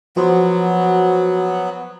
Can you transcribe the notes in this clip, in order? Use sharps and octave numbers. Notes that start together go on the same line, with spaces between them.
F3 F#3 B3 F#4 C5